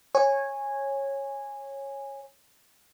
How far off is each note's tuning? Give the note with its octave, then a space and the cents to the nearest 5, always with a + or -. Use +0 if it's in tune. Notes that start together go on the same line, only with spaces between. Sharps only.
C#5 -15 G#5 -10